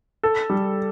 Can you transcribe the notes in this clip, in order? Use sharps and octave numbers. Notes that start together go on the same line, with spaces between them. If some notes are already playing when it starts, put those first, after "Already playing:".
A4
G3